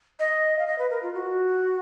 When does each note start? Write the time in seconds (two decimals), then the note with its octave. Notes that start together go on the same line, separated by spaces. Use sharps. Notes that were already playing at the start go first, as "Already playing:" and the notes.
0.20 D#5
0.59 F5
0.67 D#5
0.79 B4
0.90 A#4
1.03 F4
1.14 F#4